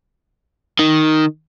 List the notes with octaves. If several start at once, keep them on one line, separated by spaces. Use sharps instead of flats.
D#3